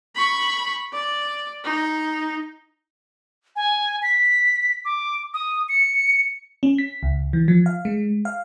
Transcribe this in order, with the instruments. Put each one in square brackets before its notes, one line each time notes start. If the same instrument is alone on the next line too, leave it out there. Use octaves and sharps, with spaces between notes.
[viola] B5 C#6
D5
D#4
[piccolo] G#5
B6
D6
D#6
C#7
[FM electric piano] C#4
B6
C#2
E3
F3
F5
G#3
F5